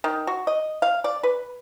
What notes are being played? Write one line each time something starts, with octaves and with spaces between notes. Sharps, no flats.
D#3
F#4
D#5
F5
D5
B4